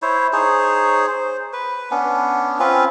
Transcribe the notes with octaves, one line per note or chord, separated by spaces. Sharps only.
E4 C5 C#5
D#4 G#4 C5 C#5
C5
B4
B3 C#4 D4
C4 C#4 F4 B4